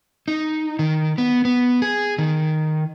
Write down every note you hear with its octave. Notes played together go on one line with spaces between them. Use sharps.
D#4
D#3
B3
B3
G#4
D#3